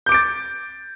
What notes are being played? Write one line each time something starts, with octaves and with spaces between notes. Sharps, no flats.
D6 G6 A6 D7